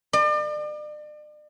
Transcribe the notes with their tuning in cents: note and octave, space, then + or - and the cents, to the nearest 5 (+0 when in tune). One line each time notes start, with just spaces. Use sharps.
D5 +40